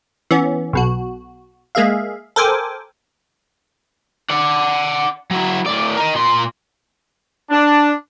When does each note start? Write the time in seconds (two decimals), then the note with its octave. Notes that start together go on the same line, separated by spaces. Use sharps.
0.31 E3 B3 C#4
0.73 B1 B2 F#4
1.75 G#3 A#3 G#4 E5 F5
2.36 A4 A#4 C5 G5 G#5 D6
4.30 D5 F#5
5.31 F#3 E4
5.66 A2 D5
5.97 A#4 D#5
6.15 A#2 C6
7.50 D4